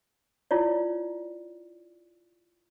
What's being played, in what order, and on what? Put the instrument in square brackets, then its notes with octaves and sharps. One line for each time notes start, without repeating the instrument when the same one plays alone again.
[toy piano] E4 F4 C#5 D5